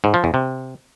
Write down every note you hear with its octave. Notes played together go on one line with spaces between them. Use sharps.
G#2
F3
E2
C3